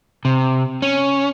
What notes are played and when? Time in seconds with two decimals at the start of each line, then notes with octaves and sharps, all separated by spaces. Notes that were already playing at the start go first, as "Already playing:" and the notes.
0.25 C3
0.82 C#4